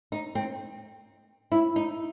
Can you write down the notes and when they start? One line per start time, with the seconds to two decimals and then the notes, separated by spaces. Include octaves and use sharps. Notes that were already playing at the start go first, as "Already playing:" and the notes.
0.12 D#4
0.35 C4
1.52 E4
1.76 D#4